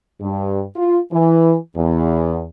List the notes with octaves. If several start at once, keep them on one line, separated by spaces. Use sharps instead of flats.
G2
F4
E3
E2